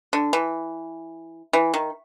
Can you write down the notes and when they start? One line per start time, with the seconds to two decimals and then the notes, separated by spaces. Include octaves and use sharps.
0.13 D3
0.33 E3
1.53 E3
1.74 D#3